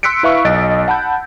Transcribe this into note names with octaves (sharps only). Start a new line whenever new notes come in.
C6 E6 F#6 B6 C#7 D7
E4 B4 E5 F5 C#6
B1 D#5 A6 D7
F#5 A5 B5 G6